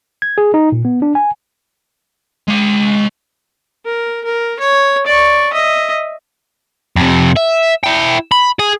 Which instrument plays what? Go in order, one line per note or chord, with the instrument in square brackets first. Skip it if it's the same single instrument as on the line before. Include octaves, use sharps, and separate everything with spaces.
[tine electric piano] G#6
G#4
D#4
A#2
B3
D4
G#5
[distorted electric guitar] G#3 F5
[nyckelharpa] A#4
A#4
C#5
D5 C#6
D#5 E5
[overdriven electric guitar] F2 C3
E5
E4 G5
B5
G#4 G#5